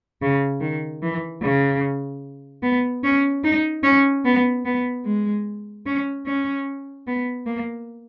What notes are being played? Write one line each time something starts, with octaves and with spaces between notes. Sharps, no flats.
C#3
D#3
E3
C#3
B3
C#4
D#4
C#4
B3
B3
G#3
C#4
C#4
B3
A#3